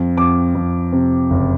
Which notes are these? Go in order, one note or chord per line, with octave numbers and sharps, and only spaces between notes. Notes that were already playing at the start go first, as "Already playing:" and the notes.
Already playing: F2
F2 D6
F2
C3
F#1